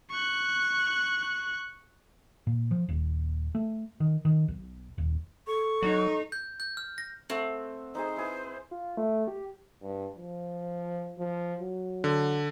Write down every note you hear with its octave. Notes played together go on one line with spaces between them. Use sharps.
C#6 F#6
A#2
F3
D#1
A3
D#3
D#3
B1
D#1
A4 C#6
F#3 D#4
G6
G6
F6
A#6
A3 C4 F#5
D#4 G#4 C5
E4 G#4 B4
F4
A3
G4
G2
F3
F3
F#3
D3